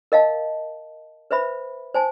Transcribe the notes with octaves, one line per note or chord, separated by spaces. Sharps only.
A#4 D#5 F5 A5
B4 C5 E5 B5
C5 G#5 A5